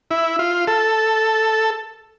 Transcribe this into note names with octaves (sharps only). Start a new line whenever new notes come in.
E4
F4
A4